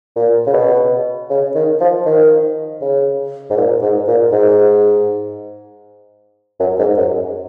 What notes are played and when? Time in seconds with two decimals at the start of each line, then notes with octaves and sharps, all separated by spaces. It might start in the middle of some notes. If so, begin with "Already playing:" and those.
0.16 A#2
0.47 C#3
0.54 B2
1.30 C#3
1.55 D#3
1.80 F3
2.06 D#3
2.82 C#3
3.50 G#2
3.57 A#2
3.82 G#2
4.08 A#2
4.32 G#2
6.60 F#2
6.79 G#2
6.97 F#2